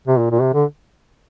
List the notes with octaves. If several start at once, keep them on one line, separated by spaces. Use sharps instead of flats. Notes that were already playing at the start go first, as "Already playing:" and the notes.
C3
A#2
A#2
C3
D3